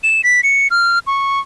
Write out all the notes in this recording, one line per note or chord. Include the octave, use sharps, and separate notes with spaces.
E7
B6
C#7
F6
C#6